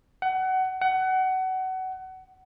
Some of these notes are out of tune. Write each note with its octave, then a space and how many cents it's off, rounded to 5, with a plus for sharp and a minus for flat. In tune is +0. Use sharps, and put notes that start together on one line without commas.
F#5 +25
F#5 +25